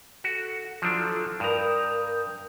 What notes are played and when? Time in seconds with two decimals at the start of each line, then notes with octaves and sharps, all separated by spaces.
0.24 F#4 A4
0.82 F3 F#3 D4 E4 F4 A4
1.40 G2 A#4 A#5 D#6 G6